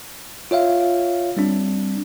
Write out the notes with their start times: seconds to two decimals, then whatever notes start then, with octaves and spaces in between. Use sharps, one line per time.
0.51 F4 C#5 E5 F5
1.37 G3 C4 D4